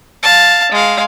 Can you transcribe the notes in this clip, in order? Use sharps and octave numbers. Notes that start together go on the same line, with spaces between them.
F5 A5
G#3 F5